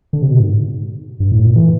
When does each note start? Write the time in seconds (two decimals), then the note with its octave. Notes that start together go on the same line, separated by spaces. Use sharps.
0.13 D3
0.22 C3
0.31 B2
0.40 G#2
1.20 G2
1.32 A2
1.44 A#2
1.56 E3